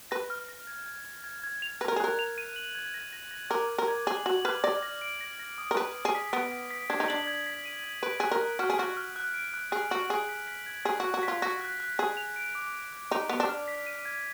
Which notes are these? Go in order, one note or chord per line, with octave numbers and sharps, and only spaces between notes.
B4 A#6
F6
A#6
G#6
G#6
G#6
G#6
G#6
F7
B4 A#6
A#4
G#4
A#4 F#6
F7
D#7
F#7
G#6
A#6
A#6
A#6
A#4 D6
G#6
A#4
G#6
G#4 F#7
F#4 F#7
B4 F6
D5 A#6
A#6
D7
A#6
A#6
D#6
A#4
B4 D7
D7
G#4
B6
B3 D7
B6
B6
D4 G#6
D#4
D4 F#7
G#6
B6
D#7
G#6
B4 D7
G#4 F#6
A#4
F#6
F#4 F6
G#4
F#4 F6
F6
F#6
D7
F#6
G#4 F#6
F#4 F#7
G#4 D7
B6
B6
G#6
G#4 B6
F#4 F#6
F#4
B6
F4
F#4 A#6
F#6
F#6
G#4 B6
F7
D7
D6
D7
F#6
D#4 F7
B3 F7
D4
F6
B6
D#7
G#6